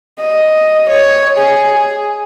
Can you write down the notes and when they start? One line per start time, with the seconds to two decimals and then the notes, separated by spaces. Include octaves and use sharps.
0.20 D#5
0.90 C#5
1.39 G#4